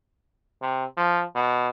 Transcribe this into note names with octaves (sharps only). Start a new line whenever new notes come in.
C3
F3
B2